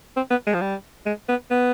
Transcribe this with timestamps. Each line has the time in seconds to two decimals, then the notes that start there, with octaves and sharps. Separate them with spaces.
0.16 C4
0.30 B3
0.46 G#3
0.54 F3
0.61 G3
1.06 G#3
1.28 B3
1.51 B3